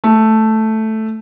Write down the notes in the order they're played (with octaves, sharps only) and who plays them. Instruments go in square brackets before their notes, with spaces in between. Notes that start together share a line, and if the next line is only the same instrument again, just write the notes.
[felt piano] A3